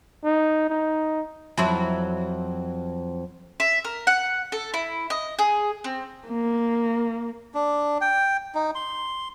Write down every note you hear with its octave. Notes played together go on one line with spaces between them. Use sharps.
D#4
D#4
F2 F#3 E4
E5
A#4
F#5
A4
E4
D#5
G#4
C4
A#3
D4
G5
D#4
C6